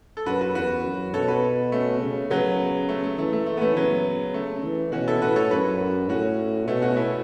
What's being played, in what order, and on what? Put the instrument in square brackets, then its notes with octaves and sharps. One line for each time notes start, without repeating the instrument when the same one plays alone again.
[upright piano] A4
[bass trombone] F#2 [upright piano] F#4 B4
[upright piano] F#4 B4
[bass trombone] E2 [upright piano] F#4 B4
[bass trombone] F#2
[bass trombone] B2 [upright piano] A4 C#5
[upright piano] F#4 B4
A3 C#4
[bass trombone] C#3
[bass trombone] C#3 [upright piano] F#3 B3
[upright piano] A3
A3
[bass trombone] E3 [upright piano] A3
[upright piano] A3
A3
B3
A3 C#4
[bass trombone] C#3 [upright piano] F#3 B3
[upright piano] A3
[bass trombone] E3
[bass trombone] B2 [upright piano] C#4 F#4
[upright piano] E4 A4
[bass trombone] A2 [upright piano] F#4 B4
[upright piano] A4 C#5
[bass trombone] F#2 [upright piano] F#4 B4
[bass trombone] A2 [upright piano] C#4 F#4
[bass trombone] B2 [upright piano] A3 C#4
[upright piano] C#4 F#4
B3 E4